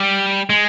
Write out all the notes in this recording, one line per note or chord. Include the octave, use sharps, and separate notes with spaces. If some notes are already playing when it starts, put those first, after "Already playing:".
Already playing: G3
G#3